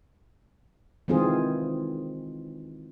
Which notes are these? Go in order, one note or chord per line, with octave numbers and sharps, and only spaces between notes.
D#3 E3 G#3 C4 F4 G#4